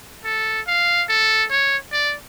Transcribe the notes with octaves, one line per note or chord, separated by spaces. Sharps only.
A4
F5
A4
C#5
D5